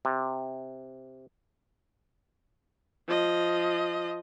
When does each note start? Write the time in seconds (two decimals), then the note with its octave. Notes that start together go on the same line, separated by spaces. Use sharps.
0.05 C3
3.07 F3 D#5